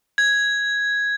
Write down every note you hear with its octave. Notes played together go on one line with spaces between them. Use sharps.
G#6